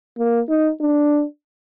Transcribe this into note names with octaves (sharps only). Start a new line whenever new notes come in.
A#3
D#4
D4